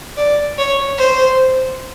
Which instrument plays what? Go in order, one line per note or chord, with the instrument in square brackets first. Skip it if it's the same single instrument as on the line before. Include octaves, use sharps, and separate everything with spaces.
[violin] D5
C#5
C5